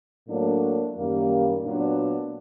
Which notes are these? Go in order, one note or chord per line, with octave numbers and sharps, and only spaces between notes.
A2 F#3 A#3 D4
F#2 D#3 G3 A#3
A#2 F#3 B3 D4